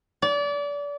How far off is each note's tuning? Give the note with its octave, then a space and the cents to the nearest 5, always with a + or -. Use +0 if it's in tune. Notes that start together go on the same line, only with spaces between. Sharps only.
D5 -30